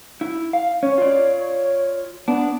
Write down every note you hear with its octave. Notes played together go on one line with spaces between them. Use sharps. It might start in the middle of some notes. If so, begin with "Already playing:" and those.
E4
F5
C#4 C#5
F4 D5
B3 D4